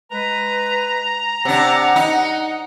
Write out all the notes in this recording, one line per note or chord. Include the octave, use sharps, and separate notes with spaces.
G#3 B4 A#5
C3 D4 F#5
D#4